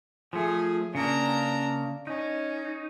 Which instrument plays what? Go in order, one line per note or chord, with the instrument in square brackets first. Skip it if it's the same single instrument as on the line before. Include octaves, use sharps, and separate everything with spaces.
[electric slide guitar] F3 A3 [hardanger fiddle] G#4
[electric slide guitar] C#3 A#3 [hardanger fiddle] D4 A#5
[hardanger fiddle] C#4 [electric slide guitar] D#4